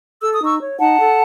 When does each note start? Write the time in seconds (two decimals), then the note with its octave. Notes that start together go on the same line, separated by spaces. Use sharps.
0.21 A4 E6
0.33 D#6
0.41 D#4 C#6 E6
0.60 C#5
0.79 D#4 F#5 A5
0.99 A4